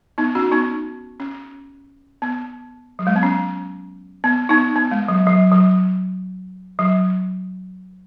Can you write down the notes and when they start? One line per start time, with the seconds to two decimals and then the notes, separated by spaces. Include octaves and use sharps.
0.18 B3 D#4
0.35 C#4 F#4
0.52 B3 D#4
1.20 C#4
2.22 B3
2.99 F#3
3.07 G#3
3.16 B3
3.23 C#4
4.24 B3
4.49 B3 D#4
4.76 B3
4.92 G#3
5.08 F#3
5.27 F#3
5.52 F#3
6.79 F#3